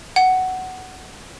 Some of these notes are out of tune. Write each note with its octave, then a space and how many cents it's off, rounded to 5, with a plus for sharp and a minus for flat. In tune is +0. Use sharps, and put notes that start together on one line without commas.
F#5 +10